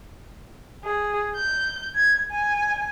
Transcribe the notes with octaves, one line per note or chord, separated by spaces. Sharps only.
G#4
G6
G#6
G#5